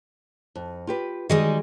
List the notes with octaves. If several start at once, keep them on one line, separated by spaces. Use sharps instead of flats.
F2
F4 G4 B4
D#3 G3 G#3 F#4 G#4 D#5